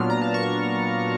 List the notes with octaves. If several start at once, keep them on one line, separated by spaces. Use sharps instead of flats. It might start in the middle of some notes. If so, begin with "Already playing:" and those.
Already playing: A#2 F#3 B3 D4 F4 F6
A#5
A5
C#6